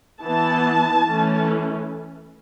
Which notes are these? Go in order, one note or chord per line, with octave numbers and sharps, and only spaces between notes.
E3 B3 A5
E3 A3 C#4